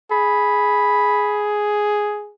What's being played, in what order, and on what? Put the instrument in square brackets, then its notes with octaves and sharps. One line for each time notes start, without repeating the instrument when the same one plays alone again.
[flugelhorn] G#4 [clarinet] B5